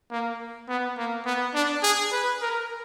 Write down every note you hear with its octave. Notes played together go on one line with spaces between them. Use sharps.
A#3
B3
A#3
B3
D4
G#4
B4
A#4